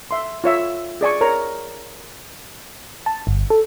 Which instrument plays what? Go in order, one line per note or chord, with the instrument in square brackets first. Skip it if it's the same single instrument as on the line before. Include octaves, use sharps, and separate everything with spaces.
[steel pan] E5 C6
F4 C#5 E5
G#4 D5 G#5 C#6
A#4 C#5 A#5
[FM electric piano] A5
G1
A4